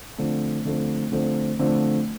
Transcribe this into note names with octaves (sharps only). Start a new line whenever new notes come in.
D3 F3 A3 C4
D3 F3 A3 C4
D3 F3 A3 C4
D3 F3 A3 C4